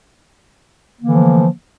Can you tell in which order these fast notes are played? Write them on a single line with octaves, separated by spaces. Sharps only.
A#3 D3 E3 A3 F3